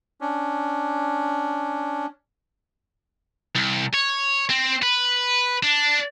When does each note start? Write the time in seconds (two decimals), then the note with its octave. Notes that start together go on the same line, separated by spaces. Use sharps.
0.21 C#4 D4
3.56 C2
3.94 C#5
4.49 C4
4.83 B4
5.63 D4